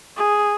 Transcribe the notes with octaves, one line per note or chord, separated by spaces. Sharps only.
G#4